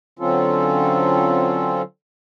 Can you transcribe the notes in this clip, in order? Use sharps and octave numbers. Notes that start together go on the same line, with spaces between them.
D3 F#3 C4 C#4 F4 A4